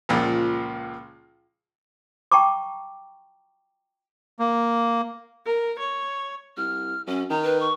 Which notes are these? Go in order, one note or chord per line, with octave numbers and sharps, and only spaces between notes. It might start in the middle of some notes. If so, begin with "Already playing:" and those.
C#2 A#2 F3
G5 A5 A#5 C#6 D6
A#3
A#4
C#5
C2 F6
F#2 C#4
D#3 A#5
B4
C#6